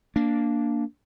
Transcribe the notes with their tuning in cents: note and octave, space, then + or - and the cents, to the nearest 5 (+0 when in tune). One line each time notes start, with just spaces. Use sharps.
A#3 -5 D4 -10